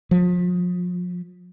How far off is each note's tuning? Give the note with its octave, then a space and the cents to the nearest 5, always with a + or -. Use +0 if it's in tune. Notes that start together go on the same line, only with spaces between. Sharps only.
F3 +35